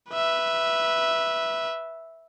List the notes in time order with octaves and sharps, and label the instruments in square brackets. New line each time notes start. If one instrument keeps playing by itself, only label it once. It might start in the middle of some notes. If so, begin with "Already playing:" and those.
[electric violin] B4 E5